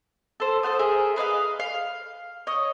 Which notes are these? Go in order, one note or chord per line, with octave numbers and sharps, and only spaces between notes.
A4 C5
A4 C5 F#5 D#6
G#4 A#4 E5
G#4 B4 D#5 F5
F5
C#5 D#5